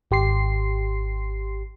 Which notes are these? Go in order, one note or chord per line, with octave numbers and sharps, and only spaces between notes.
G#1 G4 C6 C7